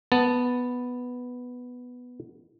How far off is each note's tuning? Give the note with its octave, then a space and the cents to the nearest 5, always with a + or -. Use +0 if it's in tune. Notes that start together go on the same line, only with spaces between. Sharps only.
B3 +0 A5 +0